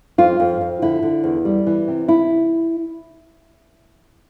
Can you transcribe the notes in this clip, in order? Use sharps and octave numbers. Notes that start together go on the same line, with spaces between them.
F2 F4
F2
F2
D3 E4
D3
E2
G3
E3
C3
E4